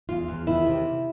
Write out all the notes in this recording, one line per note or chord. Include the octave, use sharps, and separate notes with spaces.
E2 F4
E2
D#3 E4
C3